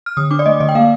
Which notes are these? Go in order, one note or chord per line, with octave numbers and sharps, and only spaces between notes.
F6
D3 D#6
D4 D6
D5
A3 D#5
D3 D#5
G5
A#3 F5